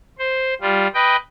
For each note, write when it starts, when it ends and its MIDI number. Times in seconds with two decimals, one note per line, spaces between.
0.19 0.54 72
0.61 0.87 55
0.61 0.87 65
0.94 1.16 71
0.94 1.16 75
0.94 1.16 79